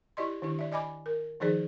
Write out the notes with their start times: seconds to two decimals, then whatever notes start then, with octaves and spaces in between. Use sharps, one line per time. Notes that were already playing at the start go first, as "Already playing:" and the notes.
0.17 E4 G4 D5 D#5 C6
0.42 D#3 D4 E4 G4
0.59 D5 E5
0.72 D5 D#5 G#5 B5 D6
1.06 A#4
1.40 D#3 F3 D#4 G#4 C5 D5